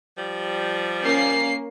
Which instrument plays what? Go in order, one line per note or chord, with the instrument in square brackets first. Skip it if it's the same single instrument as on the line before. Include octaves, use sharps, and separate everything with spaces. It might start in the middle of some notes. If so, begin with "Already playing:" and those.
[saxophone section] F3 G3
[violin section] A#3 C#4 C7